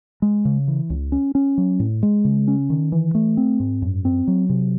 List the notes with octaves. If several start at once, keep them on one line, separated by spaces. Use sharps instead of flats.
G#3
C#3
E3
C#2
C#4
C#4
F#3
A2
G#3
C#3
C#4
D#3
E3
A3
C4
G#2
F#2
C4
F#3
C3